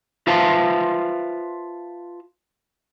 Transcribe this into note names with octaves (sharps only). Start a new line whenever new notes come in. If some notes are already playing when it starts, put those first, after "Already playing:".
F4 B4 C5 E5 F5 A5